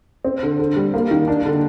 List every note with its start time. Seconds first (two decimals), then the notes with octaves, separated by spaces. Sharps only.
0.25 C4
0.43 D3
0.59 D3
0.76 G3
0.94 A#3
1.11 D#3
1.28 D4
1.46 D3